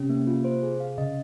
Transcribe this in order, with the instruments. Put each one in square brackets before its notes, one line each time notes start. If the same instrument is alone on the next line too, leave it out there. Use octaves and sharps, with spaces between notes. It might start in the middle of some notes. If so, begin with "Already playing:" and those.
Already playing: [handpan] C3 [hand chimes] C#4
[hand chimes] A#3
F4
C5
G#4
F5
[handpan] C#3 [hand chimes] D#5